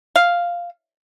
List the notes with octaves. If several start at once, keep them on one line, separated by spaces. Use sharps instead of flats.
F5